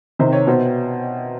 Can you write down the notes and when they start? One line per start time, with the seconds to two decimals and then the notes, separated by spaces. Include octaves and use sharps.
0.19 C3 D#3 C5
0.33 C#5
0.47 B2 C5